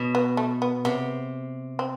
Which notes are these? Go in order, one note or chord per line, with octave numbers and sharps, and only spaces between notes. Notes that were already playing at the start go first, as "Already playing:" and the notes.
Already playing: B2
B3
A3
B3
C3 B3
C4